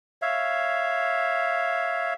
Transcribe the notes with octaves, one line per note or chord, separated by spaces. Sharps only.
C#5 E5 F5